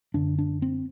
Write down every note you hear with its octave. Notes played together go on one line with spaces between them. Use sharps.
F#2 D3 D4
D4
C4